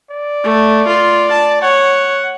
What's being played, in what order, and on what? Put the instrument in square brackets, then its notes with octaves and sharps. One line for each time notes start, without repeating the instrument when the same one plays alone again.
[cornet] D5
[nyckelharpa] A3
F4
A5
[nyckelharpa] C#5 [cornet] F#5